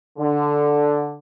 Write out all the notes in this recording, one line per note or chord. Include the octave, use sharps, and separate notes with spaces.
D3